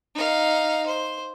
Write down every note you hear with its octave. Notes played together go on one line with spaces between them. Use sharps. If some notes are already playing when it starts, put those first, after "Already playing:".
D#4 F5
C5